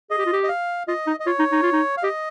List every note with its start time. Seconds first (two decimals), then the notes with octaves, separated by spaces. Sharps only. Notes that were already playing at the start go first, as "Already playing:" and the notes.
0.10 G#4 D#5
0.18 G4
0.26 F4
0.33 G4
0.44 D#5
0.49 F5
0.88 F4 D#5
1.07 D#4
1.20 D#5
1.26 F4 C#5
1.39 D#4
1.52 D#4
1.62 F4
1.72 D#4
1.97 F5
2.03 G4 D#5